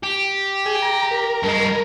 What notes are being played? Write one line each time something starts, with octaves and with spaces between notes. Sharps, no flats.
G4
G#4
A#5
A#4
G2 G#3